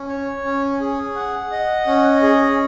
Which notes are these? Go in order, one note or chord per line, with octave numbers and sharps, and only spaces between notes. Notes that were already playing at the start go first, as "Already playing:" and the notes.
Already playing: C#4
C#5
C#4
G#4
F#5
D#5
C#4
G#4